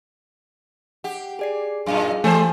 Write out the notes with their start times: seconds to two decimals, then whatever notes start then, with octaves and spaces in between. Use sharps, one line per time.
1.04 G4 F#5
1.39 G#4 D5 C7
1.86 F#2 A#2 D#4 G#4 F5
2.24 E3 A3 G4 C5 G#5 A5